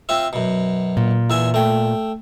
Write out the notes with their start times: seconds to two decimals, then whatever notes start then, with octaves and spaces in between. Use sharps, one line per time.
0.09 C4 F4 E5
0.33 F#2 B2
0.97 A#2
1.30 E2 E5 G#5
1.54 A3 G5